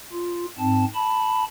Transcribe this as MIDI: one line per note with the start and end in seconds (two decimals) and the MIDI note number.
0.13 0.46 65
0.59 0.85 44
0.59 0.85 60
0.59 0.85 81
0.95 1.44 81
0.95 1.44 83